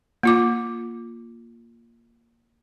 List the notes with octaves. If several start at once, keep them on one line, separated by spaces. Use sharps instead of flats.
A#3 F4 D6